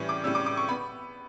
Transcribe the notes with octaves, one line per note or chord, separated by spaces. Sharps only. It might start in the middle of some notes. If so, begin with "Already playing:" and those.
Already playing: A2 E3 G3 C#4
D6
A2 G3 C#4 E6
D6
D6
C#6
B3 B5